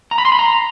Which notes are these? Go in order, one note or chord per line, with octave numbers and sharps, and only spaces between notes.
A#5
B5
C6
B5
A#5